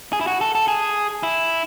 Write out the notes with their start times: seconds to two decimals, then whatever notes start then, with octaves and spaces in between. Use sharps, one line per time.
0.13 G#4
0.21 E4
0.27 F#4
0.41 A4
0.55 A4
0.68 G#4
1.23 E4